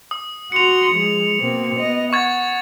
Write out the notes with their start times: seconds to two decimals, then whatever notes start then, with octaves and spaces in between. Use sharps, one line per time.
0.11 D#6
0.52 F#4 C6 D#6 C#7 F7
0.92 F3 G#3
1.41 B2 A#3 C4
1.78 B3 D#5
2.13 F#5 C#6 G#6 A6